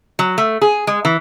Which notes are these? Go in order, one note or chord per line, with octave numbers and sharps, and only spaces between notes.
F#3
A3
G#4
G#3
E3